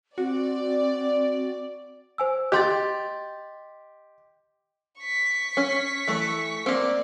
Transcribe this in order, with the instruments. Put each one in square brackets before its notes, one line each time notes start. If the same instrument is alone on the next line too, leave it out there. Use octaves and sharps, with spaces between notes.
[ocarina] C4 [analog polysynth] F#4 [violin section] D5
[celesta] C5 G#5 E6
[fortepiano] G4 G5 [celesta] D#5 C6 A6
[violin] C#6 B6
[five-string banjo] C#4
E3 A3
[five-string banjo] A#3 C4 [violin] D5